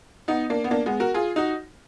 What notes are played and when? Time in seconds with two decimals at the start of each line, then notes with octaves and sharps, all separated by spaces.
0.28 B3 D#4
0.50 A#3 D4
0.64 B3
0.71 A#3 D4
0.86 G#3 B3
1.00 F#4 A#4
1.14 F4 G#4
1.36 D#4 F#4